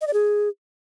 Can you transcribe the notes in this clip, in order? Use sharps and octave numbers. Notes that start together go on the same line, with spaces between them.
D#5
D5
G#4